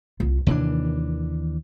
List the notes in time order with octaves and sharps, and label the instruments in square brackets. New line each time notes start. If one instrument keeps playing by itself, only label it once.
[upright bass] C2 F4
[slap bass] D#2 E3 D4 [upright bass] C3 D#3